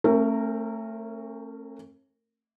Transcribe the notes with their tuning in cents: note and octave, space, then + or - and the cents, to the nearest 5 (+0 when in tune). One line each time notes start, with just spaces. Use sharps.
A3 +20 C#4 -45 A#4 -15